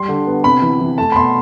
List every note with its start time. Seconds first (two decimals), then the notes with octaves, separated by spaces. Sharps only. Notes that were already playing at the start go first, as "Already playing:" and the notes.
Already playing: G3 C6
0.08 D3
0.27 B3
0.44 C3 B5
0.62 E3
0.80 E3
0.98 A3 A5
1.12 B5
1.16 B2 C6